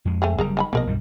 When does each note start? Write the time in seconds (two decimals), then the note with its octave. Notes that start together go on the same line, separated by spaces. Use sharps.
0.05 F2 G#3
0.22 A3 C4 G#4
0.38 F#1 G3 G#4 A#4 A#5
0.57 D#3 G#5 B5
0.73 A#1 B2 F3 A#3 A#4 D#5
0.87 B1 G2 G3